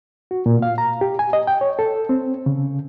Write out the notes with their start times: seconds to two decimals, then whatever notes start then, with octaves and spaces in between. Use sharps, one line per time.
0.31 F#4
0.46 A#2
0.62 F5
0.78 A#5
1.01 G4
1.19 G#5
1.33 D#5
1.47 G5
1.61 C#5
1.79 A4
2.09 C4
2.46 C#3